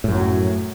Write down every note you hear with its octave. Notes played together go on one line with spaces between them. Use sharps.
F#2 A2 F#3